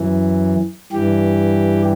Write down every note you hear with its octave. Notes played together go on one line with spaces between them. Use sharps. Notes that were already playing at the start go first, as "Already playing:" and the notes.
Already playing: F#2 E3
G2 E3 G4